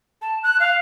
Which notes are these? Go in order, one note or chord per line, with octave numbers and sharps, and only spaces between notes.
A5
F#6
F5